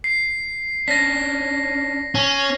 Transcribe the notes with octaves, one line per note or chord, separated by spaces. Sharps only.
C7
C#4 D4 A#6 B6
C#4